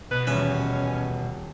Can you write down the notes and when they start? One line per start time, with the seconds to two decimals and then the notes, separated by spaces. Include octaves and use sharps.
0.11 B2 B4
0.27 D#1 E2 C#4 B4 E5